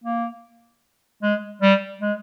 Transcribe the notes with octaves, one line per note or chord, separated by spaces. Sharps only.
A#3
G#3
G3
G#3